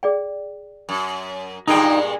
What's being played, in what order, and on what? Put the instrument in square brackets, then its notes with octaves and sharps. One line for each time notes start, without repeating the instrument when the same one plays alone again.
[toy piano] G#4 D5 G5
[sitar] F#2
[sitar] G2 A#2 G#3 [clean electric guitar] D#4 G5